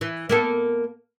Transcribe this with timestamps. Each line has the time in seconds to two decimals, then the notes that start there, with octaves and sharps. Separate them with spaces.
0.01 E3
0.29 A#3 B3 A4